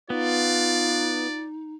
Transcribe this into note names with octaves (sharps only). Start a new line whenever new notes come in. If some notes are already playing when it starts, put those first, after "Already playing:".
B3 D#4 F4 D5